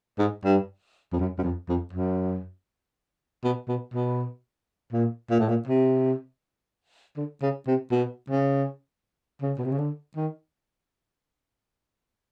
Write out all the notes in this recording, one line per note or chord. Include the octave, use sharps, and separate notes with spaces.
G#2
G2
F2
F#2
F#2
F2
F2
F#2
B2
B2
B2
A#2
A#2
A2
A#2
C3
D3
C#3
C3
B2
C#3
C#3
B2
C3
C#3
D3
D#3